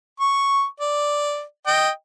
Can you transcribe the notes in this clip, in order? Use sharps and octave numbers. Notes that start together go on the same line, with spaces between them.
C#6
D5
D#5 G5